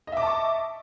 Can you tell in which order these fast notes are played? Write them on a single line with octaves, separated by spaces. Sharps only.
D#5 E5 D6 A5 C#6